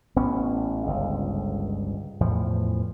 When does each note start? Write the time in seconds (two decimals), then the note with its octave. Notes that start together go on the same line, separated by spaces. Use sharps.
0.16 A1 B3 C#4
0.85 G1 C#2 G#2
2.20 E2 A2 E3 F3